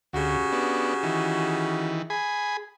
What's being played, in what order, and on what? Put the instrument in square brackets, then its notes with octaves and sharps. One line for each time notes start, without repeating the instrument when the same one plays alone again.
[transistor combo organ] D2 [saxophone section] C#3 F#4 G4
[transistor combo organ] B3 D4
D#3 E3
G#4 G#5 B5